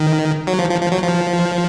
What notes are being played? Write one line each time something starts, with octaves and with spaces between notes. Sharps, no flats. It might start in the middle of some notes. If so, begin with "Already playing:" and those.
Already playing: D#3
F#3
F3
F3
F3
F#3
F3